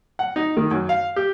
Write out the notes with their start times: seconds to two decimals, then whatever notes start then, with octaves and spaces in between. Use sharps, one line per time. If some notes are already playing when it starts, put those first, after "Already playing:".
0.19 F#5
0.36 D#4
0.57 D#3
0.71 F#2
0.89 F5
1.16 G4